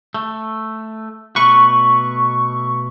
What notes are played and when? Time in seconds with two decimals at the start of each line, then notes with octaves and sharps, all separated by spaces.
0.14 A3
1.36 B2 A3 B4 C#6